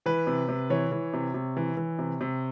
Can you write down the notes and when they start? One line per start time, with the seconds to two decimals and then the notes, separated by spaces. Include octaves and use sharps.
0.06 E3 B4
0.27 C3
0.49 C3
0.70 E3 C#5
0.92 E3
1.14 C3
1.34 C3
1.57 E3
1.77 E3
1.99 C3
2.21 C3